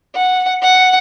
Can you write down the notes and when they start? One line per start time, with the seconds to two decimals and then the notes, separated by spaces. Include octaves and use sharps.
0.15 F#5
0.63 F#5